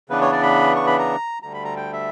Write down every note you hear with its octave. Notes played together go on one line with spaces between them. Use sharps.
C#3 E3 B3 D4 B4
C#5
D5
B5
C#6
B5
A#5
D2 D3 G3 A#5
B5
A#5
G5
E5